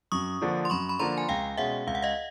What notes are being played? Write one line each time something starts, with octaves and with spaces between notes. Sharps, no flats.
F#2 C#6 D#6
D3 F3 A#3 D4
C6
F#2 B5 C#6
B5
D3 F3 A#3 D4 A#5 C6
G#5
C#2 F5 G5
B2 G#3 C#4 E5 F#5
C#2 F5
F#5
D#5 F5